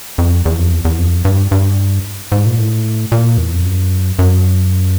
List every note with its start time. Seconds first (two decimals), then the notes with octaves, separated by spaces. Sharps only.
0.18 F2
0.45 E2
0.59 F2
0.72 E2
0.85 E2
0.98 F2
1.25 G2
1.51 G2
2.32 G#2
2.46 A#2
2.58 A2
3.12 A#2
3.38 E2
3.53 F2
3.64 F#2
4.19 F#2